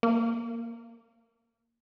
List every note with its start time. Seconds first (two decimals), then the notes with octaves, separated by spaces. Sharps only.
0.03 A#3